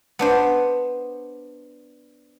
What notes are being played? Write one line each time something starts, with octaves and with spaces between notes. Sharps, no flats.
B3 D4 C5